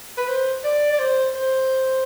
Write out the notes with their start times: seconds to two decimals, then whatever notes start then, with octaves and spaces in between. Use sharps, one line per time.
0.18 B4
0.28 C5
0.64 D5
0.92 D5
1.00 C5
1.35 C5